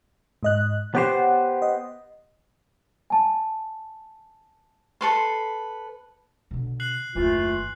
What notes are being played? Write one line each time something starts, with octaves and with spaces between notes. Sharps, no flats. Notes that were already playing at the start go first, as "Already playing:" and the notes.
G#2 D#5 F#6
B3 G4 C5 C#5 F#5
D#5
G#5 A5
A4 B4 C6
B2 D3
F#6 C7 F#7
F#1 D#2 E3 A3 F4